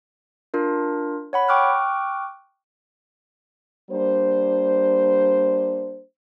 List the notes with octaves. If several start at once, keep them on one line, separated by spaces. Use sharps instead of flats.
D4 F4 A#4
C#5 F#5 B5
G5 C#6 D6 F6 F#6
G3 A#3 D4 C5